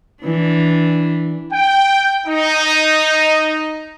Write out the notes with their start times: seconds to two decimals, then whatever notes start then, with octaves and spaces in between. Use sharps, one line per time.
0.24 E3 D4
1.53 G5
2.27 D#4